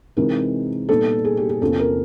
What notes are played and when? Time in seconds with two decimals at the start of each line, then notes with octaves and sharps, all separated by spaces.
0.17 C3 E3 G#3 C4 D#4 A#4
0.89 A#2 G3 B3 D#4 A4
1.25 G#4
1.37 G4
1.50 G#4
1.61 E2 C3 F3 A#3 C#4 A4
1.79 A#4